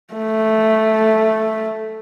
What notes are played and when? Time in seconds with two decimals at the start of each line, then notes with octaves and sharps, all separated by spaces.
0.14 A3